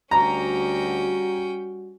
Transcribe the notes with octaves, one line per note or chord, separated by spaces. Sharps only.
D2 G3 C#4 F#4 G5 A#5